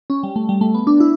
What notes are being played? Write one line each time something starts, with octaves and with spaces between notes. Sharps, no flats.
C#4
G3
A3
G3
A3
B3
D4
E4